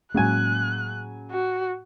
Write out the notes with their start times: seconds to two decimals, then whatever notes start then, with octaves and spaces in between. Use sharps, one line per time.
0.14 A2 C#3 F#3 G#3 A#3 G#5 F#6
1.31 F#4